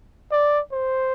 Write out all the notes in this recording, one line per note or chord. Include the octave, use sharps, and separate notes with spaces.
D5
C5